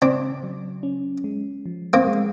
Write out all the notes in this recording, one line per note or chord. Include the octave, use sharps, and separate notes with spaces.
C#3 C4 D4
F#3
C#4
G#3
F3
A#3 C4
G#3